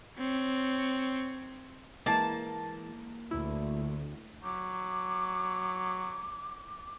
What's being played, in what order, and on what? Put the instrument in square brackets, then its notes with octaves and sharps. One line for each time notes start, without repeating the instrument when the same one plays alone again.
[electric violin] C4 C#5
[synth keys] E3 G#3 [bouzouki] A#3 A5
[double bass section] D2 [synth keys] E4
[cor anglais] F#3 [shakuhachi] D6